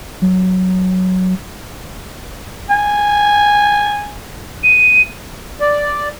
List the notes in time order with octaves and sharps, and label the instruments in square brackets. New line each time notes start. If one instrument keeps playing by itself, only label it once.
[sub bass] F#3
[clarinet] G#5
[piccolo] D#7
[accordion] D5